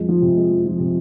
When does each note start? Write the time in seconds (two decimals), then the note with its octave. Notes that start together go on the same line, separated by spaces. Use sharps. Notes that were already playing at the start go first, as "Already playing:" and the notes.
Already playing: F2 G#3
0.09 F3
0.22 C3
0.36 G#3
0.51 F2
0.65 F3
0.79 C3